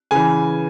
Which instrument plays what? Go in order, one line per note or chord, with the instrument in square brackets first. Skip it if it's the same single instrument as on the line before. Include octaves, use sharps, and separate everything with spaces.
[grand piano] C#3 E3 G#5